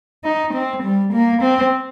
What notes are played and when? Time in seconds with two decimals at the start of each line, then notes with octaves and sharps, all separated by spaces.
0.24 D#4
0.54 C4
0.84 G3
1.14 A#3
1.42 C4